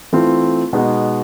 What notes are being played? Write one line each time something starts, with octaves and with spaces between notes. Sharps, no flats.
E3 A3 C4 F4
B2 G#3 B3 D#4